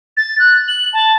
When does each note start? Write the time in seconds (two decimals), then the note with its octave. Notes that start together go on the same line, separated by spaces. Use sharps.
0.17 A6
0.39 F#6
0.68 F#7
0.93 A5